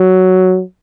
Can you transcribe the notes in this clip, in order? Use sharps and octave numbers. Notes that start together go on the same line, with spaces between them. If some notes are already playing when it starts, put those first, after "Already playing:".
Already playing: F#3